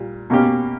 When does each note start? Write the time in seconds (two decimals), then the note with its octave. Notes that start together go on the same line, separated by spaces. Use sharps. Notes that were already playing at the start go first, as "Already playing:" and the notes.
Already playing: A#2 G3
0.30 B2 A#3 C#4 G4